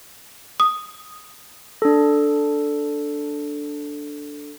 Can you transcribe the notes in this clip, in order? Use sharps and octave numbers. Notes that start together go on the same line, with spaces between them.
D#6
D4 A4